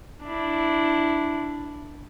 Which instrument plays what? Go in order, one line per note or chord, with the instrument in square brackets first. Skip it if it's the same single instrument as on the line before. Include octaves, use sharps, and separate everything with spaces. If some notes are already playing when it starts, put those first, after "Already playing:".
[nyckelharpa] D4 E4